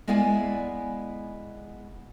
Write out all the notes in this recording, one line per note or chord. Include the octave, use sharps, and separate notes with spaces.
G#3 B3 E4 D5 F5 G#5